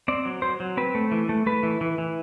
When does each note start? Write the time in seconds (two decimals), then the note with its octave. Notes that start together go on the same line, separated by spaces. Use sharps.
0.08 C4 D5
0.25 F#3
0.42 F#3 C5
0.60 F#3
0.77 C4 B4
0.95 A3
1.11 E3
1.29 A3
1.46 A3 B4
1.63 E3
1.81 E3
1.98 E3